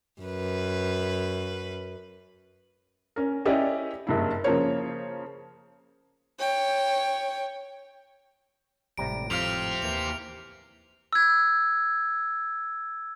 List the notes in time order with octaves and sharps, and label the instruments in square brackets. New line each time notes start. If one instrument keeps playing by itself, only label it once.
[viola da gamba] F#2 B4
[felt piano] C#4 A#4
C#4 E4 G4 D5 D#5
F#1 G2 E4
C#3 F3 A#3 A#4 C5 C#5
[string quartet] C#5 G5
[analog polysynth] G#1 A2 [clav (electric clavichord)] C3 G3 A#5 [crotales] D7
[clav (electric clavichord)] F2 F5 [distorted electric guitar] G4 C5 [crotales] F6 D7 F7
[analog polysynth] D#2 E3 A#3 [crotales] F7
[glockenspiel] E6 G#6